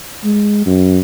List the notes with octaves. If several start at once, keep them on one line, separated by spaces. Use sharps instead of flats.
G#3
F#2